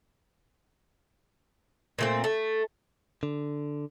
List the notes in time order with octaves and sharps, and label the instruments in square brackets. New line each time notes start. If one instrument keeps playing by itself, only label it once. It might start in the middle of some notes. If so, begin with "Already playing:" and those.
[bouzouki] A#2 A3 C4
A3
[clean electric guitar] D3